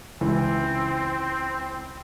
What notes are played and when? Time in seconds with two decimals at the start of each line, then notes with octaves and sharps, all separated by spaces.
0.21 C#2 E3 C4